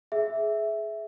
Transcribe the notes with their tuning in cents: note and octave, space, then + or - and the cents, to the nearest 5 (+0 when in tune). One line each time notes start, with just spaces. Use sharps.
G#4 +20 E5 +0